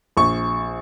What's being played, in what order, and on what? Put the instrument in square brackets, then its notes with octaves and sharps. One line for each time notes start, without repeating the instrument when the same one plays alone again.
[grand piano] A#1 C#6